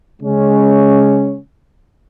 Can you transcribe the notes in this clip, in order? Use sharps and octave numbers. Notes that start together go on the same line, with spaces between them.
C#3 G#3 C#4